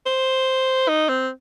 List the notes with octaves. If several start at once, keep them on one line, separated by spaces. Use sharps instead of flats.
C5
D#4
C4